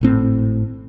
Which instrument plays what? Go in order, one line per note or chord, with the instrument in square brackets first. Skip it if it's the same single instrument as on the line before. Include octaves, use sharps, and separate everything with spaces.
[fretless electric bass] G#1 A2 C4